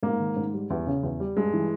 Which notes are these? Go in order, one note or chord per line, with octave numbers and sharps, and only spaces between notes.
G#2 A#3
D#3
G#2
G3
E2
C#3
E2
G3
G2 G#3
E3